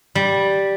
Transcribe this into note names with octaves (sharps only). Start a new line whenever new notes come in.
G3